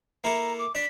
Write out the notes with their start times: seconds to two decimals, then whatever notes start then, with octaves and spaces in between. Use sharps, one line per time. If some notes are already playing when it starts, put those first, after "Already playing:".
0.24 A#3 E4 A4 A#5
0.59 D6
0.75 D4 D5 B6